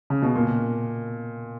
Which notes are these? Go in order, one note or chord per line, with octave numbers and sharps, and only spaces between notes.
C#3
B2
A#2